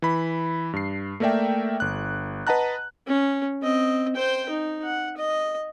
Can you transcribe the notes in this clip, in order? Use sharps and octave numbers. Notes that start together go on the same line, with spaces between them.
E3 B5
G2 C7
A3 A#3 A#4 D5 E5 G5
G1 F#6
B4 D#5 F#5 A5 A#5 F#6
C#4
C4 D#5
C5 G5
D#4
F#5
D#5